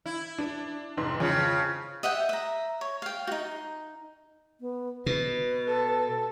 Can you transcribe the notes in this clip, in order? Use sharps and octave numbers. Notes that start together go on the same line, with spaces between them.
E4
D4
F1 G#2 C6
F2 C#3
D#5 E5 F#5 G5
E5 A#5
C#5
F5 G5
D#4 F#4
B3
B2 B4
A4